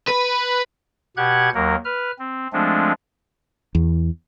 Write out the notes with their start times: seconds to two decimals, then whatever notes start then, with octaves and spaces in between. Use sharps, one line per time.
0.08 B4
1.17 B2 G4 F#5 F#6 G#6
1.54 D#2 F#3 A#3 A#4
1.85 B4 F6
2.19 C4
2.53 F3 G#3 A3 C4 D4
3.75 E2